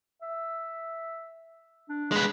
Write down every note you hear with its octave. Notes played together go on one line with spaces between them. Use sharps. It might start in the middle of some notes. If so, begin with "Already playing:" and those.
E5
D4
G#3 B4